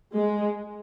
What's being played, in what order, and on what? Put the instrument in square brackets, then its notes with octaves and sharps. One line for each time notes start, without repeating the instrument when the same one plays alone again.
[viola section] G#3